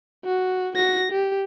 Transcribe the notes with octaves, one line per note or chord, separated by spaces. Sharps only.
F#4
F#4 A#6
G4